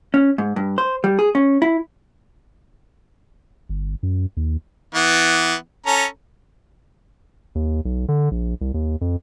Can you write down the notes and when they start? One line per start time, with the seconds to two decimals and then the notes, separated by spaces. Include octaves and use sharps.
0.14 C#4
0.38 G#2
0.56 G2
0.78 C5
1.04 G3
1.19 G#4
1.35 C#4
1.62 E4
3.69 G1
4.03 F#2
4.37 D#2
4.95 E3 B3
5.87 C#4 A4 A#5
7.55 D#2
7.85 B1
8.08 D3
8.31 A#1
8.61 C2
8.74 D#2
9.01 F2